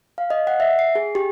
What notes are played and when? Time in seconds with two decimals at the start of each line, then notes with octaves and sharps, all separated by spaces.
0.18 F5
0.30 D#5
0.47 F#5
0.60 E5
0.79 C7
0.95 G#4
1.15 G4